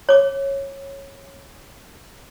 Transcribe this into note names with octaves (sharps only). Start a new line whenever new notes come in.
C#5 D6